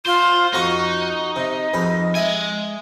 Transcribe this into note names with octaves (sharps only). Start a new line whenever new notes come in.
F4 C5
F2 D#4 F#4 A#5 C#6
C3 D#5
F2 G#2 B4
G#3 E5 G#5